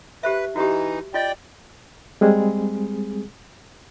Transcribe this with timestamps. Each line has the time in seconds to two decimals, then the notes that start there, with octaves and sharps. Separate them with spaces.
0.23 G4 B4 C5 E5
0.56 E3 D#4 F#4 G4
1.14 F4 D5 D#5 G5
2.21 G3 G#3 C4 G#4